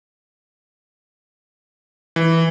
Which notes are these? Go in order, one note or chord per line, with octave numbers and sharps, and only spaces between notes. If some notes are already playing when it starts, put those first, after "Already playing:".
E3